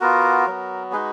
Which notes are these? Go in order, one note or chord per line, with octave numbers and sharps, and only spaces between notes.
B3 F4 F#4 A#4
F#3 B3 F#4
G#3 D#4 F#4 G#4 B4